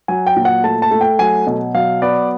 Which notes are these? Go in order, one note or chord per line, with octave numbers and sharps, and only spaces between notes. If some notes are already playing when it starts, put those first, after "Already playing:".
F#3 G#5
G5
A#2
F#5
A3 A5
A5
A3
G5
F#3 G#5
B2
F#3 F5
B3 D5